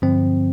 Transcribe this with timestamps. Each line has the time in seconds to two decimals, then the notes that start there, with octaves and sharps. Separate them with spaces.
0.02 G2 D3 F3 C4